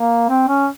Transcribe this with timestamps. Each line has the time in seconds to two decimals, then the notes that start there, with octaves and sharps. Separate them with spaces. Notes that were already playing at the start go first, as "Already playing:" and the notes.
Already playing: A#3
0.29 C4
0.48 C#4